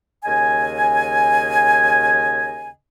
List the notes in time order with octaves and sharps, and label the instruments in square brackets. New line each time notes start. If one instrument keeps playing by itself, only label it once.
[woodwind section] D#2 C#3 D#5 G#5